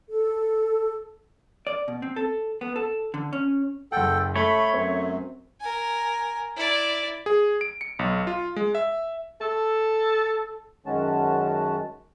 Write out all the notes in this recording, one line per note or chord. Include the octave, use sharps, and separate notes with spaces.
A4
D5
B2
C4
A4
B3
A4
D3
C#4
F#1 A4 F#5 G5
A3 A4 C#5 B5
F#2 C4
A#4 G#5
E4 D5
G#4
D7
C#7
B1
F4
G#3
E5
A4
F#2 D#3 G#3 C#4 F#4 A5